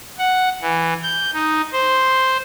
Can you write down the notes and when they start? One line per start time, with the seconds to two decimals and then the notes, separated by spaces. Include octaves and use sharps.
0.19 F#5
0.62 E3
1.03 G6
1.33 D#4
1.73 C5